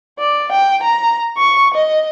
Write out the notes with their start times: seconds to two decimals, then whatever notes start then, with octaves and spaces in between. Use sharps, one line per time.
0.19 D5
0.52 G5
0.83 A#5
1.38 C#6
1.74 D#5